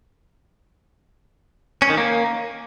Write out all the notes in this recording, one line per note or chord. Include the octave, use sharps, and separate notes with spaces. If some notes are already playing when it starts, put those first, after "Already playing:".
C#4
D#3
A#3